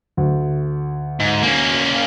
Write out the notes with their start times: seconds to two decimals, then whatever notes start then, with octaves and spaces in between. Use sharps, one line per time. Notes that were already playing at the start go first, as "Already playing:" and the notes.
0.17 D2
1.20 G#2
1.43 A#3 C#4